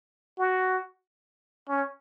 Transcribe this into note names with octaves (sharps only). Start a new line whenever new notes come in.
F#4
C#4